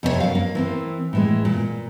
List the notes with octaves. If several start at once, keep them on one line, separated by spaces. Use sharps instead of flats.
F2 C3 A4 C#5
F#2 F5
A#3
E3 A#3 C4
A2 E3 G#3
A#2